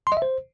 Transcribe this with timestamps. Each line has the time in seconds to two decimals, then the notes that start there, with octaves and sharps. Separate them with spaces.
0.07 C6
0.12 D#5
0.17 E5
0.22 C5